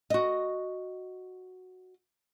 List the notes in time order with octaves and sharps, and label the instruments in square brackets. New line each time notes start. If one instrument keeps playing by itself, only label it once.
[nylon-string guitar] F#4 D#5